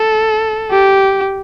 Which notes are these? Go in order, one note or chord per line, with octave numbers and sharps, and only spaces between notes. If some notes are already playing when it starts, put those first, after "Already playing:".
Already playing: A4
G4